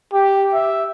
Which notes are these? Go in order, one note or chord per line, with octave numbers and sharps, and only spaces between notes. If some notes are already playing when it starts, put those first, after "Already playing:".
G4
E5